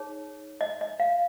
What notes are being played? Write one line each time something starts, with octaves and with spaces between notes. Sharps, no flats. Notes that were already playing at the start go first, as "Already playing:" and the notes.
Already playing: D#4 G#4 C#5
D#5
D#5
F5